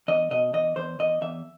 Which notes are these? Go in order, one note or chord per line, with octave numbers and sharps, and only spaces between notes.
E2 D#5
B2 D#5
E2 D#5
E2 C5
E2 D#5
E2 E5